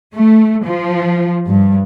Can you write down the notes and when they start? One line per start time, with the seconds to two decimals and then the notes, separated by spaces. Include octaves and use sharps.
0.14 A3
0.65 F3
1.47 G2